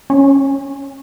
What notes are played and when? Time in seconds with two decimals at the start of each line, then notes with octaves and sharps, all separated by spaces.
0.10 C#4